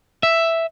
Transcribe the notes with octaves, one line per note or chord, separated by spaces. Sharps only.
E5